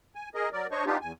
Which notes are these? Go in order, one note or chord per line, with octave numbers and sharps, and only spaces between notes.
G#5
G#4 A#4 D#5
F#3 A#4 D5
D4 C5 C#5 D#5 C#6
B3 D4 D#4 F4 G4
E2 G#5